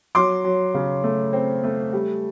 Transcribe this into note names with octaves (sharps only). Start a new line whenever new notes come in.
F#3 C6 D6
F#3
C#3
A3
C4
A3
G3